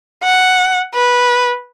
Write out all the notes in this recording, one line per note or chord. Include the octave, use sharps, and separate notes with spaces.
F#5
B4